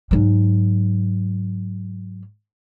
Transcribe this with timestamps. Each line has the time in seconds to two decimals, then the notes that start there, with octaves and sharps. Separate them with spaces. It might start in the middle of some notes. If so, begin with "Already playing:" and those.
0.11 G#2 F#3